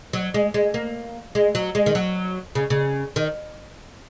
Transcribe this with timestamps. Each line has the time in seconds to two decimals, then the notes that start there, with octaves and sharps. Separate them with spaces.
0.13 F#3
0.34 G#3
0.54 G#3
0.74 A#3
1.35 G#3
1.55 F#3
1.75 G#3
1.86 D#3
1.95 F#3
2.55 C#3
2.70 C#3
3.16 D#3